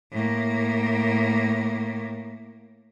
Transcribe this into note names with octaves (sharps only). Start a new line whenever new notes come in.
A2 A#3